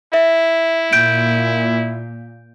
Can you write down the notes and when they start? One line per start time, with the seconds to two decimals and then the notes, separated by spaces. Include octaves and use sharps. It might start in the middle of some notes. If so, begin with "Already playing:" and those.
0.14 E4 E5
0.93 A#2 G6 D7